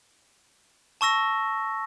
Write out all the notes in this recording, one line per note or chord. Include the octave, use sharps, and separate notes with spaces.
A5 C#6 E6 A#6